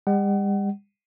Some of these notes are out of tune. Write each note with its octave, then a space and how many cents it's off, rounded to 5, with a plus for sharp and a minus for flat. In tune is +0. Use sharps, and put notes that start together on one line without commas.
G3 +40 F#5 +35